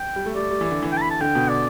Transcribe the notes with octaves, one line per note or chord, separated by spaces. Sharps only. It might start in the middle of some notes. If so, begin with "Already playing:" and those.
Already playing: G5
G3
A3
G3 D5
G3
E3
D3
E3
G5
A5
B5
A5
D3 G5
B2
D5